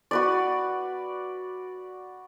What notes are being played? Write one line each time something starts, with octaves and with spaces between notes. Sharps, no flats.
F#4 B4 D5